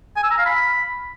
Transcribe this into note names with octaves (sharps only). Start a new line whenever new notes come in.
G#5
E6
A#5
F5
B5